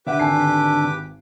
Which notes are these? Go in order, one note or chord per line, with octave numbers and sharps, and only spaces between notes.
D3 G4 B4 E5 F#5 D6
G#1 A4 G#5 C7